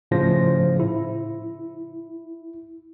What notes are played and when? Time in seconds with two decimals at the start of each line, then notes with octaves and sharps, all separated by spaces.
0.11 A2 C#3 F3 C5 A#6
0.80 E4